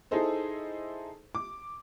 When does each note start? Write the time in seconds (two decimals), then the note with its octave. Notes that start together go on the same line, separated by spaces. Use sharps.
0.11 D#4 E4 G#4 A4 C5 D#5
1.35 D6